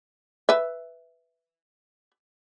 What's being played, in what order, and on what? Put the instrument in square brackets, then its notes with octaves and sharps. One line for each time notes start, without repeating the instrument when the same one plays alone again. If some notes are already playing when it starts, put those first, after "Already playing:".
[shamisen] B4 E5